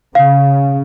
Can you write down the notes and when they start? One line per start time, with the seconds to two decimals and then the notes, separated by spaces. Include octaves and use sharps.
0.15 C#3 F5